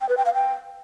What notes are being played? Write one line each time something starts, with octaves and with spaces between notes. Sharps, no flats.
G5
B4
G5
F5
G5